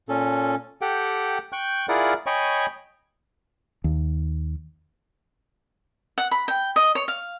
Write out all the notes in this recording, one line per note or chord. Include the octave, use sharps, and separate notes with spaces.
A#2 C#4 A4
G4 A4 F#5 G5
G5 C#6 F#6 G6
E4 F4 G#4 A#4 D5 F#5
C#5 D#5 G5 G#5 B5 C#6
D#2
F#5
B5
G5
D#5
C#5
F5